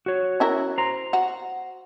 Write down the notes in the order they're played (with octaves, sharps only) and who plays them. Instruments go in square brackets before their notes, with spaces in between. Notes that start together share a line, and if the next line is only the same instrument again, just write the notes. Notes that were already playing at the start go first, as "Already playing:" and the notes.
[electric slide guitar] F#4 C#5
[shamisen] C#4 E4 A#4
[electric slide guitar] C5 A#5
[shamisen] F#4